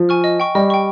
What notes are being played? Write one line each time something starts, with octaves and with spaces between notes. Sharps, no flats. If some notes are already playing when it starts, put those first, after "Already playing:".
Already playing: F3
G#5 C#6 F6
D#5
G5 C#6
G3 D#5
G5 C#6